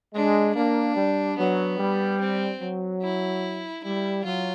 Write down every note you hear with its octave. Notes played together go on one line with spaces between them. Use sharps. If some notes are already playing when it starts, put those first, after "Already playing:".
G#3 D4
A#3 D4
G3
F#3 B3
G3
C4
F#3
E4
G3 E4
F#3 F4